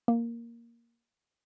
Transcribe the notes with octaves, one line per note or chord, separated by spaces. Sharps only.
A#3